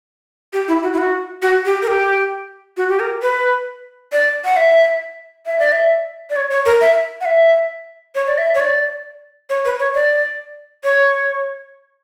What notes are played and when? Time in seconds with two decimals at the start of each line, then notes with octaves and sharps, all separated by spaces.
0.53 G4
0.68 E4
0.83 F#4
0.93 E4
0.98 F#4
1.42 F#4
1.65 G4
1.82 A#4
1.88 G4
2.77 F#4
2.89 G4
3.00 A#4
3.22 B4
4.12 D5
4.45 F#5
4.56 E5
5.46 E5
5.59 D5
5.72 E5
6.30 D5
6.36 C#5
6.51 C#5
6.66 A#4
6.81 E5
7.21 F#5
7.25 E5
8.15 C#5
8.27 D5
8.38 E5
8.55 C#5
8.60 D5
9.50 C#5
9.65 B4
9.80 C#5
9.94 D5
10.84 C#5